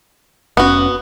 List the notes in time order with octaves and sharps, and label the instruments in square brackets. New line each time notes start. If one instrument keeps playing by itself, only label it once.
[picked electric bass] F1 C#4 [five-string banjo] B3 F#4